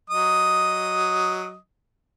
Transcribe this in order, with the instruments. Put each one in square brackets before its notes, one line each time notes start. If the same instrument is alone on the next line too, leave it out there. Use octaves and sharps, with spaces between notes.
[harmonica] F#3 D#5 D#6